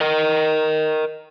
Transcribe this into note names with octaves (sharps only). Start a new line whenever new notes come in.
A#4 D#5